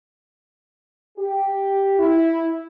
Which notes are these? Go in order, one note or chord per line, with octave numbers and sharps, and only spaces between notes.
G4
E4